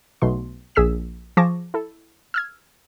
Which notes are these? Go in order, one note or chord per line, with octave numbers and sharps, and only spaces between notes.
B1 B2 A3 C6
A#1 G#4 E6 B6 E7
F3 G#4 A5 C#6 D6 A#6
E4 A4
E6 F6 G#6